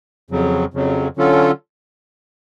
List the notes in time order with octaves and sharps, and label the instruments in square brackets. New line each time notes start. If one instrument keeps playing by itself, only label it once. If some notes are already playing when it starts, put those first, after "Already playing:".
[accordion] F2 C#3 F#3
F2 C#3 F#3
D3 F#3 C#4 F4 A4